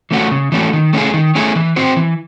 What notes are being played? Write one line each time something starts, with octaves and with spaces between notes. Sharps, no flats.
E3 A3 C#4 F#4
C#3
E3 A3 C#4 F#4
D#3
A3 C#4 E4 G#4
D#3
A3 C#4 E4 G#4
E3
C4 F#4 C5
E3